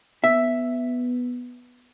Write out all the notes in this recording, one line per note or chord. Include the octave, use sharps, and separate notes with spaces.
B3 E5